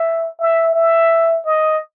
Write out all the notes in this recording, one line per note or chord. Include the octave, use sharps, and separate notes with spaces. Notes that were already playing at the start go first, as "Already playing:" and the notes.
Already playing: E5
E5
E5
D#5